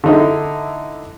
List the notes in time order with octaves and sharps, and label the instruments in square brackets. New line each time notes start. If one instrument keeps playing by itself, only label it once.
[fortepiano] D3 D#4 E4